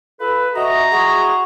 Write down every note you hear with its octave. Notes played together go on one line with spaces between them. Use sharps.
F4 A4 B4
F#4 D#5 E5 A#5 C#6
E4 F#4 G#4 F#5 C6 C#6